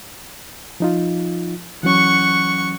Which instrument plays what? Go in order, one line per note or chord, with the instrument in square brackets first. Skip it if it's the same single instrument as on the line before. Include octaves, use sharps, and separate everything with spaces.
[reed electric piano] F3 D#4 F4
[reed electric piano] E3 F#3 C#4 [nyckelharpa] F#5 C#6